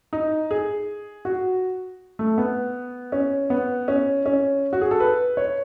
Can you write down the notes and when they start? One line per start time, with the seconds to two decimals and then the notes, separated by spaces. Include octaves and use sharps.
0.13 D#4
0.51 G#4
1.25 F#4
2.19 A3
2.38 B3
3.12 C#4
3.50 B3
3.88 C#4
4.26 C#4
4.73 F#4
4.81 G#4
4.91 A4
5.00 B4
5.37 C#5